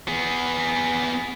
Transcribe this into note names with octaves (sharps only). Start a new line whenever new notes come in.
B3 G#4